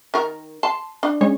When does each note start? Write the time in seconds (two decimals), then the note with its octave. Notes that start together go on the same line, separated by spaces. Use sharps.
0.14 D#3 A#4
0.63 A5 C6
1.03 D4
1.21 G#3 C#4 C#5